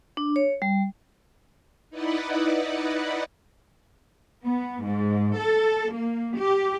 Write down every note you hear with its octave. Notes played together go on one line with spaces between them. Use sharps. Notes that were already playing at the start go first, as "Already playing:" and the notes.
D4
C#5
G3
D#4 E4 B4 D5 D#5 F#5
B3
G#2
A4
A#3
G4